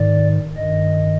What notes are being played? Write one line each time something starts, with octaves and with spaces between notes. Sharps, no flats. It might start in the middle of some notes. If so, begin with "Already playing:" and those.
Already playing: G#2 D#3 D5
G2 D#3 D#5